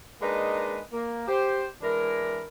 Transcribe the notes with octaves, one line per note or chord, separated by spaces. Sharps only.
G#3 A#3 D4 D#4 B4 D#5
A#3
G4 C5
E3 G#3 D4 E4 A#4